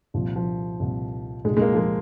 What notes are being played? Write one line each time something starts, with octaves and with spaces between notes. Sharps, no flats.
C2 A#2 F3
F3
C2 A#2
C2 A#2 G#3
G#3
A#3
F3
G#3